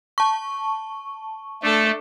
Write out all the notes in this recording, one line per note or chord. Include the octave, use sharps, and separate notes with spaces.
A5 C#6
A3 D4 A4